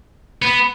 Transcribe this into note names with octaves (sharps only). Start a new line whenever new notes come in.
B3